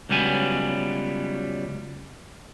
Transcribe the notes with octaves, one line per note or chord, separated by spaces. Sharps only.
C#2 F#3 G3 B3 G#5